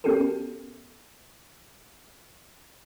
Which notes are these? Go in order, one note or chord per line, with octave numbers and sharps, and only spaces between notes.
B3 C#4 F#4 G4 A4 A#4